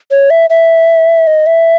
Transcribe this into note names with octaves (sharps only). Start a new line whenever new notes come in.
C#5
E5
E5
D#5
E5